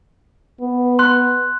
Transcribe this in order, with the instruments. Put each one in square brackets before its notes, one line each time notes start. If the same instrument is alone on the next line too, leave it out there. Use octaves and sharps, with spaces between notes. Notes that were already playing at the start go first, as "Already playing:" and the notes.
[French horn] B3
[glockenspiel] C6 F#6